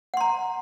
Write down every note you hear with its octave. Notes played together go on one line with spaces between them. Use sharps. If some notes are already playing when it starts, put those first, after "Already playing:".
F#5 A#5 C6